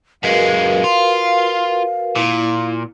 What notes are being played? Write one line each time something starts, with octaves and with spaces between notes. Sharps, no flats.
F#2 G#3 F#4 A#4 B4 F5
F4
A#2 E4